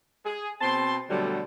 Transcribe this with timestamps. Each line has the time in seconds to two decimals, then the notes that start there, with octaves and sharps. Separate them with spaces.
0.25 G#4
0.61 B2 C4 A5 C6
1.10 B2 D3 F#3 G3 A3